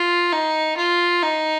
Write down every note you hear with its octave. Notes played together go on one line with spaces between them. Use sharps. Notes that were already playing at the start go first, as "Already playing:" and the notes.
Already playing: F4
D#4
F4
D#4